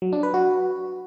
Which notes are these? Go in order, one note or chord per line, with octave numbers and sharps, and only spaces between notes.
F#3
D4
B4
F#4